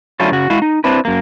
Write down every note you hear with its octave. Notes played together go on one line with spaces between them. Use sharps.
D3 F#3 A3 C#4 E4 F4
C#3 F#4
G#3 E4 F#4 F5
D#4
C4 D4 E4 B4
F#2 A#3